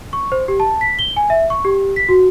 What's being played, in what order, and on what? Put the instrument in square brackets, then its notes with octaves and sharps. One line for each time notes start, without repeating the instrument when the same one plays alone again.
[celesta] C#6
C5
G4
A5
B6
G7
G#5
E5
C#6
G4
B6
F#4